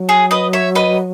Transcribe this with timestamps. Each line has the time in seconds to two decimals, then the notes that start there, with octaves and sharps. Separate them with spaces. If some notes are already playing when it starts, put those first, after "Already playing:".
Already playing: F#3
0.09 G#4
0.31 B4 D#5
0.53 C#5 E5
0.75 B4 D#5